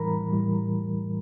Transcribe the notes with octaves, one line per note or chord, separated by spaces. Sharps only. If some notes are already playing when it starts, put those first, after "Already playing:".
Already playing: A2 E3 G3 A#4 A#5 B5
A2 E3 G3